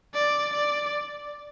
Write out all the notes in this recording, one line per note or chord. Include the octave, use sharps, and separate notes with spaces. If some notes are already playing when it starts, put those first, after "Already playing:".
D5
D5